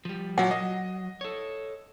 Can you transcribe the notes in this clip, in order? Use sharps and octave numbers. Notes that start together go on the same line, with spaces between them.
F3 G3
A#2 F#3 C#5 F#5
F#3 D#5
A4 C#5